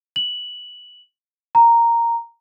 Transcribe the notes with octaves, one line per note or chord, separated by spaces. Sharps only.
F#7
A#5